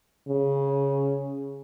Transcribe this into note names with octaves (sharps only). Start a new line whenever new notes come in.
C#3